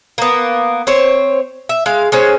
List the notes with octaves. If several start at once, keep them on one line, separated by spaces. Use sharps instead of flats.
A#3 B3
C4 C5 C#5
E5
G#3 F5
G#3 C#4 C5